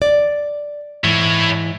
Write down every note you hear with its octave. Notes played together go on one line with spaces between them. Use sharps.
D5
G#2 E3 E4 C#5